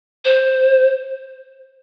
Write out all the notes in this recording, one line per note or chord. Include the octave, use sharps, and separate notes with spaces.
C5